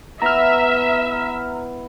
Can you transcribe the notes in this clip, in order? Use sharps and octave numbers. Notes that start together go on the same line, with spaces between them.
B3 E4 E5 A#5 F6